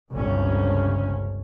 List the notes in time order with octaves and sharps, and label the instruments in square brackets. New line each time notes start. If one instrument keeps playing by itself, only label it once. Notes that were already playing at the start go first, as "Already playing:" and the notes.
[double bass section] G1 C#2 C3 C#4